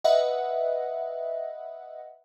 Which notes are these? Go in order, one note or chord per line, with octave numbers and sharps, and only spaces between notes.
B4 D#5 E5 F#5